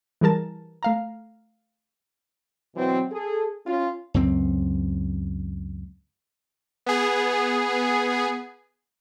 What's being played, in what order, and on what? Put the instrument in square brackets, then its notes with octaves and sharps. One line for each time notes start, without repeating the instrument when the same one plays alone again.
[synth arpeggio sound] E3 G3 G#4 A#4 A5
A3 F5 A#5
[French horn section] B2 E3 F#3 B3 C4
G#4 A4
C#4 F4
[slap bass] C#2 F#2 C4
[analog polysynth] B3 G#4